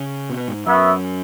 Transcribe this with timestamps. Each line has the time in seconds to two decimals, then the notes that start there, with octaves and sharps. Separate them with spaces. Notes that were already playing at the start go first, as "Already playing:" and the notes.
Already playing: C#3
0.30 B2
0.48 G#2
0.66 F#2 B3 F#4 E5